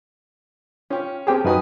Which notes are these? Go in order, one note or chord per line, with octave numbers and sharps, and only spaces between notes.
C#4 F4 G4
C4 G4 G#4 A#4 G5 A5
F#2 D#4 F#4 B4 G#5 D#6